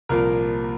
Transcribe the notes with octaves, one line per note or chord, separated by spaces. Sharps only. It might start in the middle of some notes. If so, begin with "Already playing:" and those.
C2 A#2 F3 A#3 A#4